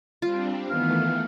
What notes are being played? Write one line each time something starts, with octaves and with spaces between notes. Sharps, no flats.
G3 C4 D4 F4
D#3 E3 A3 B3 F5